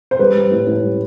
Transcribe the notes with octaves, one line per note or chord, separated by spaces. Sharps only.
C5
G3 B4
G3
A2
A2
G3